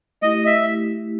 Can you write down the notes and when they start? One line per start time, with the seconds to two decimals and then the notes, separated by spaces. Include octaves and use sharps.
0.22 A3 E4 G4 D#5
0.46 E5